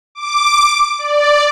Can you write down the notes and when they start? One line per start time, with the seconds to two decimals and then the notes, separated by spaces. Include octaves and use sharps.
0.15 D6
0.99 D5